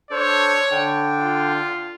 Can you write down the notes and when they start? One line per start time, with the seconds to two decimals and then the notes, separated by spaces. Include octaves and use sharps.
0.11 D4 A4 C5 C#5
0.72 D3 D4 G5
1.20 F4